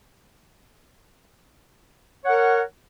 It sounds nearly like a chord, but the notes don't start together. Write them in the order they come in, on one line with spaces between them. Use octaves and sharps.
C#5 F#5 A#4